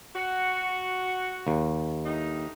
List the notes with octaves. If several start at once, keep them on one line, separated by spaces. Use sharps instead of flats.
F#4
D#2
G2 A3 D#4